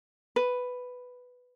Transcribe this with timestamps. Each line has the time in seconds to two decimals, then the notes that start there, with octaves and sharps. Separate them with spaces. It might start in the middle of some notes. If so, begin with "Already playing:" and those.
0.36 B4